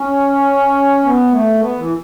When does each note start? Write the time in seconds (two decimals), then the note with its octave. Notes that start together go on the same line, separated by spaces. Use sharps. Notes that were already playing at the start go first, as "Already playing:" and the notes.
Already playing: C#4
1.04 B3
1.32 A3
1.60 B3
1.78 E3